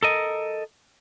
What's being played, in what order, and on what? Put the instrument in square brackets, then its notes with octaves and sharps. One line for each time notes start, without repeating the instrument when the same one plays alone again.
[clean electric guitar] A4 A#4 D#5